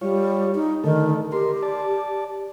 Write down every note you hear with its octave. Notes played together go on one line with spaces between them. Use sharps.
G3 F4 C#5
D#4
D3 D#3 A3 A4
G4 A#4 C6
D5 A5